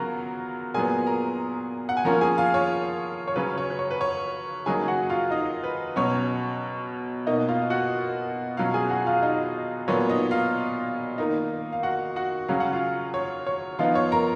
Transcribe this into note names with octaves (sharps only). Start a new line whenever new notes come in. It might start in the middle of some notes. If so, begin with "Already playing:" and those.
Already playing: C#3 F#3 B3 F4 F#4 A#4 A#5
A#2 F#3 B3 G#4 G#5
A#4 A#5
F#5
G#5
F3 A#3 C#4 A#4 A#5
G#4 G#5
F4 F5
C#5
C#5
C#3 F#3 C#4 B4
C#5
B4
C#5
B4
C#5
C#3 F#3 A#3 D#4 G#4 G#5
F#4 F#5
F4 F5
D#4 D#5
B4
B2 F#3 C#4 C#5
B2 A#3 D#4 D#5
F4 F5
F#4 F#5
B2 F#3 C#4 F4 F5
G#4 G#5
F#4 F#5
F4 F5
D#4 D#5
A#2 F#3 B3 C#5
D#4 D#5
F4 F5
D#3 A#3 D#4
F5
F#4 F#5
F#4 F#5
C#3 F#3 C#4 F5
F#5
F4 F5
C#5
C#5
F3 B3 D#4 F4 F5
C#5
A#4 A#5